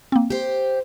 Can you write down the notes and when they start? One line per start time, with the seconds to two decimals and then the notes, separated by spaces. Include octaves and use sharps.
0.12 A#3 C4
0.30 G4 C5